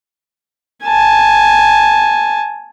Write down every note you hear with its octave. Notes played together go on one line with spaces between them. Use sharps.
G#5 A5